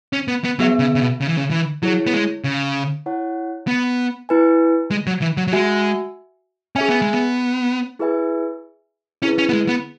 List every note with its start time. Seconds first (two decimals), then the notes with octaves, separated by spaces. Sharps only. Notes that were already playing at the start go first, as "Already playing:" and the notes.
0.13 C#4
0.28 B3
0.44 B3
0.59 F#3 B3 G#4 E5
0.79 C#3
0.95 C#3
1.00 B2
1.21 C#3
1.28 E3
1.37 C#3
1.51 E3
1.83 F#3 E4 G#4 C#5
2.07 B3
2.13 G#3
2.44 C#3
3.06 E4 C#5 F#5
3.68 B3
4.29 E4 B4 G#5
4.91 G#3
5.07 F#3
5.22 E3
5.37 F#3
5.48 F#3
5.53 G#3 F#4 E5 G#5
6.76 C#4 G#4 E5 G#5
6.89 B3
7.02 G#3
7.14 B3
7.99 E4 G#4 B4 E5 G#5
9.22 C#4 E4 G#4 B4
9.38 C#4
9.49 B3
9.53 G#3
9.68 B3